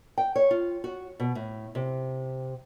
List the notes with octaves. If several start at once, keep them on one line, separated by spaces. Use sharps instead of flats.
G5
C#5
F4
F#4
B2
A2
C3